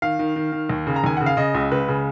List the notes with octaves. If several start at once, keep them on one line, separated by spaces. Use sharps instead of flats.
D#3 F5
D#3
D#3
D#3
D#2
C#3
A#5
D#2 G#5
C#3 F#5
F5
C#3 D#5
C#2
C#2 B4
C#3